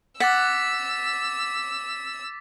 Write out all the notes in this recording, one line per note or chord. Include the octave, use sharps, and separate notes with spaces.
F#5 D6 E6 A6 B6